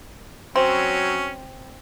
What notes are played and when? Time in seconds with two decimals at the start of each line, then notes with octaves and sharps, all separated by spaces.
0.56 F#3 C4 C#4